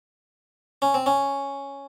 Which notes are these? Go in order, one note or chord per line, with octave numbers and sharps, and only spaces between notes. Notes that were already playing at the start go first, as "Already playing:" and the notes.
C#4
C4
C#4